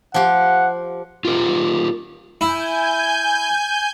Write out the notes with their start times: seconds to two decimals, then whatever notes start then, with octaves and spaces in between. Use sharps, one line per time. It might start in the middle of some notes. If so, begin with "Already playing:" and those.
0.14 F3 G4 F#5
1.25 F4 G4 A#4
2.41 E4 G#5 G6